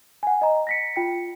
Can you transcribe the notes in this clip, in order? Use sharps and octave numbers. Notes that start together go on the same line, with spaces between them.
F#5 G#5
D#5 A#5
A#6 B6 C#7
F4 G5 C#7